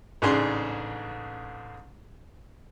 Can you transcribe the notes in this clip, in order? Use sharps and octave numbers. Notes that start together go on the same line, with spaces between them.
A1 G#2 C#3 D4 G#4 C6